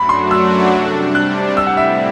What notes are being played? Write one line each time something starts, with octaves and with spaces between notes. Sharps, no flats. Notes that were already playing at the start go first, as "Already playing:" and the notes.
Already playing: F#2 F#3 A3 D4 F#4 B5
C6
E6
C3 G3 D4
F#6
A2 G3 C4 E4 E6
F#5
E5